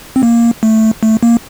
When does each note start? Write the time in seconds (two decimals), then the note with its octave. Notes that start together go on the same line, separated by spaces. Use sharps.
0.16 C4
0.23 A#3
0.63 A3
1.03 A3
1.23 A#3